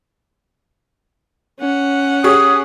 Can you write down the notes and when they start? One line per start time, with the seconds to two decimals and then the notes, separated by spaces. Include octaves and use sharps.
1.60 C#4 F#5
2.24 G4 G#4 C#5 D#6